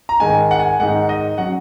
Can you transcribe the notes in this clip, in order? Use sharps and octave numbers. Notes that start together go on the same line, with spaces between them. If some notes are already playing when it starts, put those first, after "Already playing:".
A#5
G#2 D#3 G#3 D#4 G#5
F#5
G#5
G#2 D#3 G#3 D#4 F#5
D#5
F#3 C#4 F#5